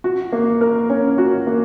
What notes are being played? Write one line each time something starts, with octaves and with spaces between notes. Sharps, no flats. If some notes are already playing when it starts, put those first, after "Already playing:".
F#4
A#3
A#4
C#4
F#4
A#3